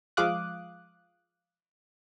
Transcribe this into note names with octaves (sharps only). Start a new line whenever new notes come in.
F3 G#3 F5 D6 D#6 F#6